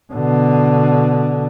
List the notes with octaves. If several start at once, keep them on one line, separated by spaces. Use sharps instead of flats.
B2 D3